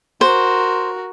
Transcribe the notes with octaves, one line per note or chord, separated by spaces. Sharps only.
F#4 A#4 C5